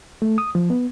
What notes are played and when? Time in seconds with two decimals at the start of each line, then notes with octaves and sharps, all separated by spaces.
0.22 A3
0.38 D#6
0.55 F3
0.70 B3